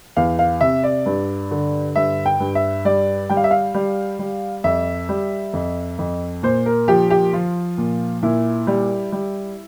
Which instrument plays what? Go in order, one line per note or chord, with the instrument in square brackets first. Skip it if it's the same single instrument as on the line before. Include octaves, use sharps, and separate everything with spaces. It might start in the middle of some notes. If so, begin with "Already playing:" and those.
[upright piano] E2 F5
F5
C3 E5
D5
G2
D3
G2 E5
G5
G2
E5
G3 D5
G3 G5
F5
E5
F5
G3
G3
F2 E5
G3
F2
F2
A#2 C5
A#4
F3 G4
G4
F3 F4
A#2
A#2 E4
G3
G3